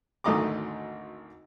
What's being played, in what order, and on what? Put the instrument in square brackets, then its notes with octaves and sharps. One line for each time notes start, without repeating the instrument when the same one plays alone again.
[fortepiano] G#1 D2 A3 D#5 A#5 D6